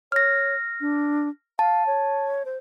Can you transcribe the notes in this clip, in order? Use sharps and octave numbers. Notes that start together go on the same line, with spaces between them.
C#5 F6 A#6
D4
F5 A5
C#5
C5